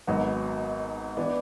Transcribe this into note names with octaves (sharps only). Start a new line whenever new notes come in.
G#1 G#2 F#3 B3 F#4
E3 B3 D4